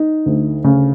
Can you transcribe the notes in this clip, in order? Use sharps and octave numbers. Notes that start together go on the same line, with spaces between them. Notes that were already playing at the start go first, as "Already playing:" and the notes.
Already playing: D#4
D2
C#3